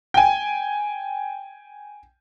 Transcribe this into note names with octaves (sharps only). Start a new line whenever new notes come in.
G5 G#5